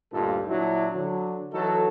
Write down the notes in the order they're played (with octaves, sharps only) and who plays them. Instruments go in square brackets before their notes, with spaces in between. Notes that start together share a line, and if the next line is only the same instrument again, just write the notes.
[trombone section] D2 G2 A#2 D#4 F4 A4
A#2 F#3 D4 E4
D3 F#3
E3 F#3 D#4 F#4 A4